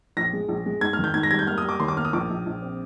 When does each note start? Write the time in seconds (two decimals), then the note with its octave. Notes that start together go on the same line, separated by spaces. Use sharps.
0.17 A#1 A#6
0.33 G#3
0.49 A#1
0.66 G#3
0.81 G#2 G#6
0.93 F6
0.99 D#3
1.04 G6
1.14 G#2 G#6
1.23 A#6
1.31 G3 G#6
1.39 G6
1.47 A#3 F6
1.58 D#6
1.64 G3 D6
1.80 D#2 C6
1.88 D6
1.97 A#3 F6
2.05 D#6
2.13 A#1 D6
2.30 A#1
2.46 A#1
2.62 C4